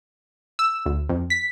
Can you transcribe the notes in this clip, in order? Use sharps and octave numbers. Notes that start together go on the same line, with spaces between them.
E6
D2
F2
B6